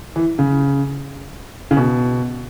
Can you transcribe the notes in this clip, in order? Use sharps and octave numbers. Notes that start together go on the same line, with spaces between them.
E3
C#3
C#3
B2